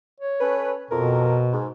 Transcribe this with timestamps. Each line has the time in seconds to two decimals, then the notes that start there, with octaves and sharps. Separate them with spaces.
0.20 C#5
0.41 C#4 A4 B4
0.91 F2 B2 A#4
1.53 G#2